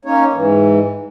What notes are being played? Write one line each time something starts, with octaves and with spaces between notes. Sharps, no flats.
A#3 C#4 D#4 C#5
G#2 E3